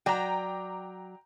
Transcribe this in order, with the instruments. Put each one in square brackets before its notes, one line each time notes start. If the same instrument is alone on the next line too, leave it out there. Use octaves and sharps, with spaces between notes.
[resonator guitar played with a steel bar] F#3 D5 [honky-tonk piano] G5 A#5